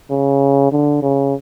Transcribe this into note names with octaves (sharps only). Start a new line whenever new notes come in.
C#3
D3
C#3